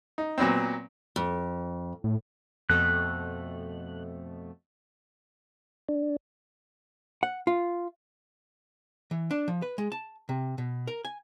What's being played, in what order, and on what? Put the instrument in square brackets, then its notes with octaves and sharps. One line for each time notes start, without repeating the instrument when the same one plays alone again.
[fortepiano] D#4
A#2 F#3 B3 C4
[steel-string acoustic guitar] F2
[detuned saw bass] A2
[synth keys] F2 B2 A3 [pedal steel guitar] F#6
[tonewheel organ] D4
[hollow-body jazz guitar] F#5
F4
E3
D4
F3
B4
G#3
A5
C3
B2
A#4
G#5